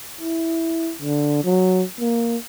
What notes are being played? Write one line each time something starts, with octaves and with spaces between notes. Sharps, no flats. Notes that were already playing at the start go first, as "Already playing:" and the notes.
E4
D3
F#3
A#3